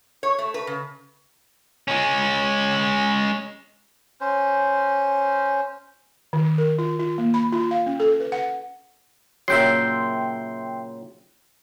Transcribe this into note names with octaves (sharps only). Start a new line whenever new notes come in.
C#5
A3
B4
C#3
G#3 C#4
C#4 C5
D#3
A#4
F4
F4
A#3
B5
F4
F5
C#4
A4
B4
F#5
A#2 C#3 F#3 E5 G5 C6